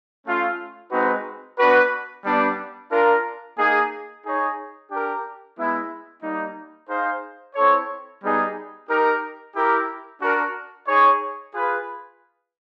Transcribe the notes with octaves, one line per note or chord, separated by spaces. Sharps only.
A3 C#4 F4
G#3 C4 D#4 F#4 B4
B3 D4 F#4 B4
G3 B3 D4
D4 F4 A#4
A#3 D#4 G#4
D#4 G#4 C#5
D4 G4 A#4
G#3 B3 E4
G3 A#3 D#4
D#4 G#4 C5 F5
C4 E4 A4 C#5
G3 B3 D#4 G#4
D#4 G4 A#4
E4 G4 A#4
D4 F#4 A#4
D#4 G#4 C#5
F4 G#4 B4